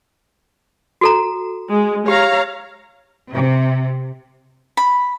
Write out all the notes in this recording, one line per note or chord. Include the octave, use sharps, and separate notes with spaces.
F#4 A4 A#5
G#3
G4 C#5 F5 A#5
C3
B5